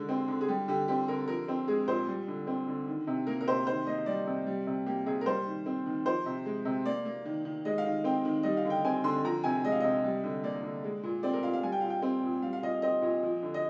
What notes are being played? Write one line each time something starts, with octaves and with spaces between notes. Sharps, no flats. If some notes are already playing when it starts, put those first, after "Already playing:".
Already playing: D3 G#3
C4
D3
G#4
G3 G4
D3 G4
C4 G4
D3 A#4
F3 A#4
C4
G#3 G#4
A#2 C5
G3
D3
C4
D3
D#3
C3
A#3 A#4
A#4
C3 C5
D#3 C5
A#3 D#5
G3 D5
C3
G3
C3
A#3 G4
C3 G#4
A#4
G3 C5
D#3
C4
D#3
F3 C5
C3
G#3
C3
A#3 D5
A#3
D#3
D#3
G#3 D#5
F5
D#3
C4 G5
D#3
G3 D#5
F5
D3
G5
C4 G#5
D3 C6
F3 A#5
C3 G#5
G#3 D#5
F5
C3 D#5
G3
D3
A#3 D5
D3
G#3
A#2
C4 D5
A#4
A#2 F5
F5
G3 G#5
G5
A#2 F5
G5
C4
A#2
G3 F5
F5
A#2 D#5
C4 D#5
A#2
F3
D3
D#5